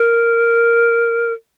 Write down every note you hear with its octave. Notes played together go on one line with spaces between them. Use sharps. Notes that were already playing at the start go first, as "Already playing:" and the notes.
Already playing: A#4